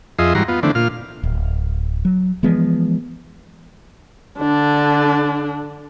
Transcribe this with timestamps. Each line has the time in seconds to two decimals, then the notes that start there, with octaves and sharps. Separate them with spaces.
0.19 F2 F4 G#4 D#5 E5 C6
0.35 G#2 E3 G3 F#4 A#5 C6
0.48 B3 F4
0.63 D3 E3 A3 C4 D4
0.75 A#2 F4 F6
1.23 D1
2.05 F#3
2.43 E3 F3 G#3 B3
4.40 D3 D4